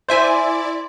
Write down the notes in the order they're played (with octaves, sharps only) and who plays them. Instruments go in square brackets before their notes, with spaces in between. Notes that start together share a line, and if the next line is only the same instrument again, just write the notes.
[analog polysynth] E4 D5 [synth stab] C5 E5 G#5 [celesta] C6